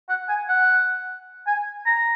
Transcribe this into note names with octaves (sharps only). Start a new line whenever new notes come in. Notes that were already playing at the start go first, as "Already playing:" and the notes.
F#5
G#5
F#5
G#5
A#5